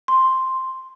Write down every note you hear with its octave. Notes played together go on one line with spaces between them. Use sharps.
C6